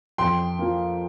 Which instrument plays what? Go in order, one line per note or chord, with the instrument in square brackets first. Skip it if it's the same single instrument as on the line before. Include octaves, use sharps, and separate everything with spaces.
[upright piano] F2 G5 C6
F3 A#3